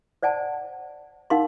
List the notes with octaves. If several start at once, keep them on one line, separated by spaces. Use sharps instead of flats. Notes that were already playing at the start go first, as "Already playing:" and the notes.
C5 D5 F#5 G#5 A5
D#4 A#4 F5 F#5 B5 C6